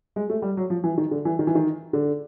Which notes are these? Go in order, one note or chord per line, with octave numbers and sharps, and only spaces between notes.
G#3
A3
G3
F#3
F3
E3
D#3
D3
E3
D#3
E3
D#3
D3